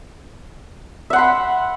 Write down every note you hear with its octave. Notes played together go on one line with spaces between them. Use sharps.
E5 F#5 B5 C6